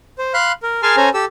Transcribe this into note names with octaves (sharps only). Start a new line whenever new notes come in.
C5
F5 B5 C6 F#6
A#4
G#4 A#4 G#5 A5 C6 F6
C#4 A4 C5 G#5 A#5
G4 A4 E6